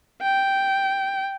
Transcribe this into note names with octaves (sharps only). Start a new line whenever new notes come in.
G5